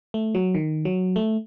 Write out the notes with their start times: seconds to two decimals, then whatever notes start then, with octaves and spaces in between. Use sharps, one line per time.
0.14 A3
0.35 F#3
0.55 D#3
0.85 F#3
1.16 A3